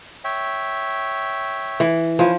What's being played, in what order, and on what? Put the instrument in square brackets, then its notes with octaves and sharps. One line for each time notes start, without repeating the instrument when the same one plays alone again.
[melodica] C#5 E5 G5
[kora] E3
[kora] F3 [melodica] C#4 B4 G#5